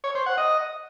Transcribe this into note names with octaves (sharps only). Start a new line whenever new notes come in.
C#5
C5
F#5
D#5